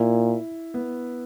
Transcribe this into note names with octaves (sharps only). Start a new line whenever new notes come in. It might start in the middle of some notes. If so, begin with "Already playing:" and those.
Already playing: A#2 E4
B3